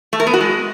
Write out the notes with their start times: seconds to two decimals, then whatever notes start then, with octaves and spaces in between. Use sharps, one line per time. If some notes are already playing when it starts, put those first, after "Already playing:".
0.13 A3
0.20 A#4
0.27 B3
0.34 F#4
0.40 G#3